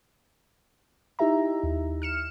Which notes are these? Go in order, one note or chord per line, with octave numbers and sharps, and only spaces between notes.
D#4 E4 G4 E5 A#5
D#2
F6 C#7 E7